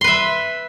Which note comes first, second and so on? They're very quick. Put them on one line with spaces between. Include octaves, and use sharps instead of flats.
C6 B4 E5